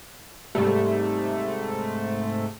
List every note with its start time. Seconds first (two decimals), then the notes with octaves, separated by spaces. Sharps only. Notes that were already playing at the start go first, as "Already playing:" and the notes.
0.55 G#2 C3 G3 A3